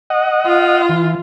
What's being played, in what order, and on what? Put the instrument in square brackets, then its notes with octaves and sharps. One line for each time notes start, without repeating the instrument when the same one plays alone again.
[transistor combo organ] D#5 F#5
[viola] F4
[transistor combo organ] E3